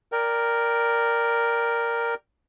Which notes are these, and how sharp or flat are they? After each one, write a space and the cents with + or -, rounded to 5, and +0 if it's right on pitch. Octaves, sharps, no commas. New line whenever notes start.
A#4 +0 D5 +0 G5 +0